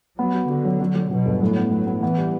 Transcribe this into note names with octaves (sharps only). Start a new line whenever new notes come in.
F#3 B3
F#4
D3 F#4
F#3
F#3
F#3
B2 F#3
G1
A2 F#3
B3
F#3 B3
B3
E3 B3
G3